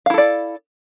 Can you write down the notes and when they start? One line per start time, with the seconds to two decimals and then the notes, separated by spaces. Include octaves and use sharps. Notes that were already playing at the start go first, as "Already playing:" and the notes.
0.06 F5
0.10 E4
0.14 A4
0.18 D5